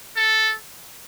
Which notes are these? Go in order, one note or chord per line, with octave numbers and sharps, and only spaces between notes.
A4